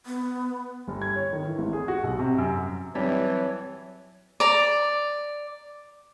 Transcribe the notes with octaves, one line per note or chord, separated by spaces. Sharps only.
B3
G1
G#6
C#5
D#3
E3
G#1
G#4
F#4
B1
C3
F#2
F#3
E3 F#3 G3 C4 C#5 A5
D5 A#5